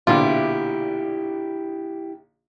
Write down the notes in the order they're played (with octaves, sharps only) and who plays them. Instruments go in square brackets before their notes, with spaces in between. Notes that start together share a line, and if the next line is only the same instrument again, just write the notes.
[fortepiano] A#1 B2 D3 [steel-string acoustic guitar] E4 G4 [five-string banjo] F4